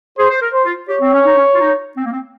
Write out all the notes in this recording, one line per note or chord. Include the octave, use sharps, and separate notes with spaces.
G#4 C5
C5
A#4
C5
F4
G4 C#5
C4
C#4
D#4
C#4
F4
D#4
C4
A#3
C4